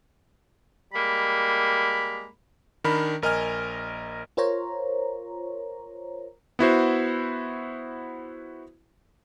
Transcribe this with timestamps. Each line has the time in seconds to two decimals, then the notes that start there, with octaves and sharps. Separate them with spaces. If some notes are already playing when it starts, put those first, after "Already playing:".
0.93 G3 G#3 A#3 B5
2.84 D#3 D4 A#4 B5
3.22 A#1 A#4 D#5 G#5 F6
4.37 F4 A#4 C5 C#5 A#5
6.59 B3 E4 F#4 C5